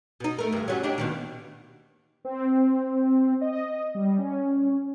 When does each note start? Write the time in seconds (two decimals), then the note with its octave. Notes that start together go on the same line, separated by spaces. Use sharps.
0.20 B2 D#4
0.38 A3 A#4
0.53 D2 G2
0.68 F#3 G3 C#4
0.83 D4 D#4 G4
0.98 D#2 B2 D#3
2.25 C4
3.41 D#5
3.95 G3
4.18 C#4